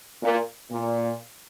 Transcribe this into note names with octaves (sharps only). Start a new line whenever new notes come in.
A#2
A#2